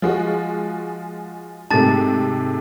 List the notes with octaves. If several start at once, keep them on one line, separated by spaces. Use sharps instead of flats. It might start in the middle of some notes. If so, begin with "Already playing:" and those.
F3 G#3 F#4
G#2 C3 A3 A5 A6